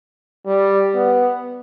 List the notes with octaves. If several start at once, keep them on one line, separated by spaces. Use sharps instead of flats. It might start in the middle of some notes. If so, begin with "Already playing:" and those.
G3
B3